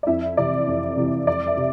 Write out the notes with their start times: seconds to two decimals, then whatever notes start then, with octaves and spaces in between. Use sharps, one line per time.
0.03 D5
0.07 F2 E4 E5
0.37 C3 E3 D5
0.67 F2
0.97 C3 E3
1.27 F2 D5
1.47 E5
1.57 C3